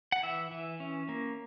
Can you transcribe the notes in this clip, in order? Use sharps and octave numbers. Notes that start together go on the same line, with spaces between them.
F#5
E3 E5
E3
C#4
A#3